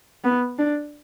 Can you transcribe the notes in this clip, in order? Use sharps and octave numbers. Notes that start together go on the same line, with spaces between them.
B3
D4